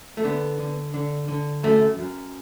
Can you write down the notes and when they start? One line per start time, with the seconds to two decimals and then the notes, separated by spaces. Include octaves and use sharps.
0.17 A3
0.24 D3 B3
0.59 D3
0.94 D3
1.28 D3
1.63 F#2 A3
1.99 F#2